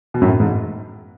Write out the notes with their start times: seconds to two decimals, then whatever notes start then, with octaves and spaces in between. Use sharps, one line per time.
0.14 B2
0.22 F#2 A2
0.40 G#2